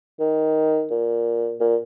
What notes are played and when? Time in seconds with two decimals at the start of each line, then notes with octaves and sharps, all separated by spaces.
0.20 D#3
0.90 A#2
1.60 A#2